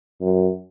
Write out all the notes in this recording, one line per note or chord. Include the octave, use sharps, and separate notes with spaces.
F#2